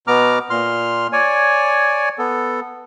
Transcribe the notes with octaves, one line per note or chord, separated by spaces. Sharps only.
B2 B3 A#5 D6 F6
A#2 C6 F6
C#5 D5 G#5
B3 A4